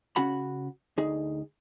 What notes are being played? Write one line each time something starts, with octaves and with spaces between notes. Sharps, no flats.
C#3 C#4 F#4 F#5 B5
D2 D#4 G#4